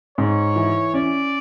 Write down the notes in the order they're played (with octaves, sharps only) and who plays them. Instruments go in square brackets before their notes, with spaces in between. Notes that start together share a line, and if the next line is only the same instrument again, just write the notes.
[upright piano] G#2 [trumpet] C#5
[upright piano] E3
[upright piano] C#4 [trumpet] D5